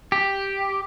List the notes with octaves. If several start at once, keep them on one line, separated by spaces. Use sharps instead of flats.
G4